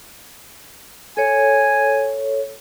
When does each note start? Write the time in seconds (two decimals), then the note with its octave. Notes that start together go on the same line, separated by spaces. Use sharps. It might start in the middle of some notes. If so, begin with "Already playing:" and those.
1.17 A4 C#5 G#5